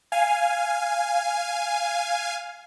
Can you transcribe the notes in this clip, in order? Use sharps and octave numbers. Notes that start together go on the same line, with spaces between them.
F5 G#5